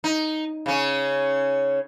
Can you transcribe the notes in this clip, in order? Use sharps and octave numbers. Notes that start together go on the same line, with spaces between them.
D#4
C#3 C#4